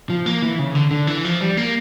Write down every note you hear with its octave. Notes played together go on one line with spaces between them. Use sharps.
F3
A#3
E3
C#3
D3
D3
E3
F3
G3
A#3